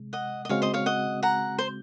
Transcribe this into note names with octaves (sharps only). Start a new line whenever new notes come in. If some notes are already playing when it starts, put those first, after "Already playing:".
Already playing: C3 G#3
D#5 F#5
D#5
C#3 G#3 C4 F#4 C#5 F5
C5 D#5
C#5 F5
D#5 F#5
F#5 A#5
C5